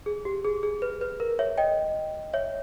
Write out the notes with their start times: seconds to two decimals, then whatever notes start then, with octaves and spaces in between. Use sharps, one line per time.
0.06 G#4
0.25 G4
0.45 G#4
0.63 G#4
0.82 B4
1.01 B4
1.20 A#4
1.39 C#5 E5
1.58 D#5 G5
2.33 C#5 E5